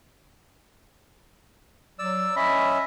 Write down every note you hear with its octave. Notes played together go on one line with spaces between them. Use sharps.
F#3 D5 E6
C#4 D#5 E5 B5